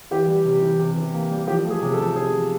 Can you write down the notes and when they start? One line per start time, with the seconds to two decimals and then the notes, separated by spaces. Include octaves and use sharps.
0.11 E3 G4
0.28 G3
0.45 C3
0.62 E3
0.79 C3
0.96 E3
1.14 A#3
1.31 G3
1.47 F3 G4
1.65 A3
1.70 G#4
1.82 C3
1.93 A4
1.98 F3
2.16 C3 G#4
2.32 F3